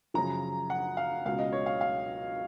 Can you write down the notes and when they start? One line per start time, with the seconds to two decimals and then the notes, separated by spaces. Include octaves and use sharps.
0.14 F#2 C#3 F3 A#5
0.70 F#5
0.97 F5
1.26 C#2 B2 F5
1.39 D#5
1.52 C#5
1.66 F5
1.81 F5